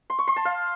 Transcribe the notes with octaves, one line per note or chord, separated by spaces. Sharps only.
C6
C#6
C6
A5
F5